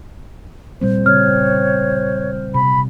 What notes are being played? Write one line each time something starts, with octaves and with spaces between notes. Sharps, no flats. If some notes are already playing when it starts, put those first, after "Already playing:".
A#2 G3 C4 C5
C#3 C4 C#5 F6
C3 B5